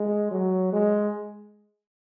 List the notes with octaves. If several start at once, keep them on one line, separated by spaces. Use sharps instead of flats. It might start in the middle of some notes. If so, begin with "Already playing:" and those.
Already playing: G#3
F#3
G#3